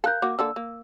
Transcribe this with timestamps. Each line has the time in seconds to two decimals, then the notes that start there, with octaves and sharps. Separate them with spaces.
0.04 A4 A#4 F5 F#6 G6
0.22 A#3 F#4 D6
0.39 D3 A#3 A4 E6
0.56 A#3